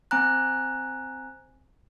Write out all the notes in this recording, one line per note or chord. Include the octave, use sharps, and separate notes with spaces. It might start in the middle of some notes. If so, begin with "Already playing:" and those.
C4 G#5 A#5 F#6